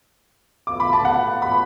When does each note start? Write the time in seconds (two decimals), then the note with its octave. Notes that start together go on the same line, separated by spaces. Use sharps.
0.67 D6
0.80 B5
0.93 A5
1.05 F#5
1.42 B5